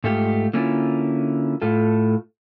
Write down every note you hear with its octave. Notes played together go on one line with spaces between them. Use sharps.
G#2 A3 F4 G4
D3 A#3 C#4 E4 F4
A2 F4 A4